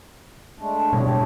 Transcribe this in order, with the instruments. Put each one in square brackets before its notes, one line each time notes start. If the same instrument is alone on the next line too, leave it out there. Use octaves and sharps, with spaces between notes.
[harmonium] G#3 A3 D4
[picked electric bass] B2 G3 G#3 [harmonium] D4 G4 C#5